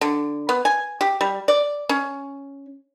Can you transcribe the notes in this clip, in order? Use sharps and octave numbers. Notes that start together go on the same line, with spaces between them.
D3
B3
G#5
G4
G3
D5
C#4